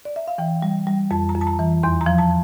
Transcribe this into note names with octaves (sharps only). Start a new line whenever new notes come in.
D5
E5
F5
E3 G5
G3
G3
F2 A5
A#5
F2
A5
A#5
E3
E2 C6
A#5
F3
A5